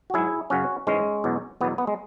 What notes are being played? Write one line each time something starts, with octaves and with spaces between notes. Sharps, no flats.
F#4
G#2 F#3 E4 G#4
F#2 C#3 F#3 C#4 F#4
G#2 E3 G#3 C#4
E2 B2 F#3
E2 B2 F#3 B3
B3
G#3